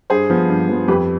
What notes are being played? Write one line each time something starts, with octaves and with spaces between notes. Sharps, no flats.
G2 G#4 C5
F3 B3
G2
F3 B3
F2 G4 B4